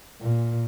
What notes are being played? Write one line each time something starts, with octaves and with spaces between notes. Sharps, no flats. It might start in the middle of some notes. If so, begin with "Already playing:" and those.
A#2